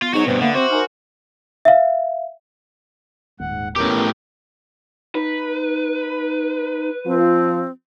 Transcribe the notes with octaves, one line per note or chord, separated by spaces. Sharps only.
B3 F4
G#2 D#4 F#4 C#5
G2 B2 C4 B4
D3 A#3 B3 E5 D6
C4 F#4 C5
D#4 A#4 G#5 F6
E5 F5
D#1 G#2 F#5
A2 B3 C#4 G4 A#4
D#4 B4
F3 C4 F4